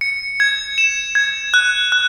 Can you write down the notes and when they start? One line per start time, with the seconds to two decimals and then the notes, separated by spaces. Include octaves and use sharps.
0.01 C#7
0.40 G#6
0.78 E7
1.15 G#6
1.54 F#6
1.92 F#6